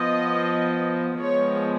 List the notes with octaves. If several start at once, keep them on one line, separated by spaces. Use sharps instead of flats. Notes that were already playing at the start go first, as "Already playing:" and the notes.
Already playing: F3 B3 D#5
F3 G#3 B3 C#5